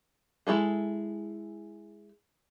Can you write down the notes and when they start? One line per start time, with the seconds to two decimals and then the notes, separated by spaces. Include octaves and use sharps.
0.47 G#3 E4 G#4 A4